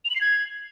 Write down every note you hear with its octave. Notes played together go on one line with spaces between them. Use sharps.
F7
F#7
C7
G#6